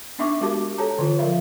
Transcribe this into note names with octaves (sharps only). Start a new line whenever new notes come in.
B3 D4 D#4 E5 C#6 D6
G#3 F#4 G4 A#4 A5 D6
A4 C#5 A5 A#5
D3 E3 F4
F3 A#4 E5 F5